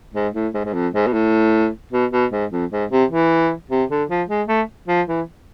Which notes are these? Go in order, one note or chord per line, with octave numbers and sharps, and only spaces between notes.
G#2
A2
G#2
G#2
F2
G#2
B2
A2
B2
B2
G#2
F2
G#2
C3
E3
C3
D3
F3
G#3
A3
F3
E3